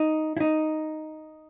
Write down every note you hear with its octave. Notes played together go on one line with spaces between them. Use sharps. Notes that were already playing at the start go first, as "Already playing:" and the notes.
Already playing: D#4
E4
D#4